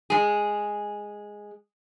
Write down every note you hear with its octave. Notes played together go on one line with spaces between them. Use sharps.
G#3 G#4